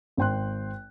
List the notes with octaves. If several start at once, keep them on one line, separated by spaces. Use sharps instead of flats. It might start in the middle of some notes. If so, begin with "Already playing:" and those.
G#1 C5 G5 C6 F#6